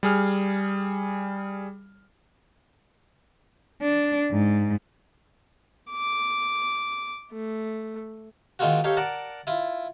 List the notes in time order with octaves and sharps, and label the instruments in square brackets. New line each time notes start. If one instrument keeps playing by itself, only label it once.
[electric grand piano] G3 G#4 F6
[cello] D4
G#2
[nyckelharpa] D6
A3
[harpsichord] D#3 G#3 A#3 C4 F4 F#4
D#4 G4 A4 C#5 F5
A#4 D5 F#5 A5 A#5
E4 F4